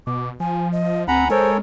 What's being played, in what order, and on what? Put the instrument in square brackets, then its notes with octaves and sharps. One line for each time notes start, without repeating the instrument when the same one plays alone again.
[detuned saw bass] B2 [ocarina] D6
[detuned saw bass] F3 [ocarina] G#5
[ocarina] D#5
[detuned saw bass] D2 [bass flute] C4 [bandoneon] F#5 A#5 B5 [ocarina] G#5
[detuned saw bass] G#3 [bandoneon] A4 A#4 C#5 [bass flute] C5